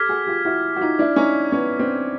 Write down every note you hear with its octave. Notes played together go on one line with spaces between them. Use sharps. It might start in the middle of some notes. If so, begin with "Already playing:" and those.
Already playing: G4 A4 D6 F6 G#6 B6
F#4 G#4
F4 G4
E4 F#4
F#4
D#4 F4
D4 E4
C#4 D#4
B3 C#4
C4 D4